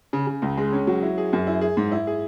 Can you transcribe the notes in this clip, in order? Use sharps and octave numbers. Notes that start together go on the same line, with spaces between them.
C#3
C#3
C#2
G#3
C#4
F#3
E4
G#4
F#2
E4
G#4
G#2
E4
G#4